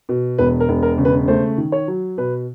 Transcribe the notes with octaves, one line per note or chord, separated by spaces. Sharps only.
B2
E1 B4
A#4
E1
A#4
C#3
B4
A3 C5
D#3
C#5
F#3
B2 B4